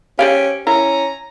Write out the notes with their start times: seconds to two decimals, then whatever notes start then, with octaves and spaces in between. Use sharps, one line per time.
0.19 C#4 G4 C5 D5 F5
0.67 C#4 E4 A#5